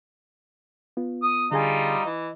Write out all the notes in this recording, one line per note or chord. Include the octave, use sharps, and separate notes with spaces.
B3 F4
D#6
D3 G3 D#4 F4 G#4 G#5
E3 D#5